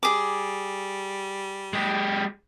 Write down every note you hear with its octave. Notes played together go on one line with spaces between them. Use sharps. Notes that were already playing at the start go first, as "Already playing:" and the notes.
G3 G#4 D6
G#3 G4